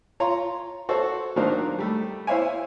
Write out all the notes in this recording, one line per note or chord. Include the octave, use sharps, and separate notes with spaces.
F4 C#5 A#5 C6
F#4 A4 C5 C#5
D#3 F#3 A#3 D4 C5
G3 A3
E4 C5 C#5 E5 F5 G#5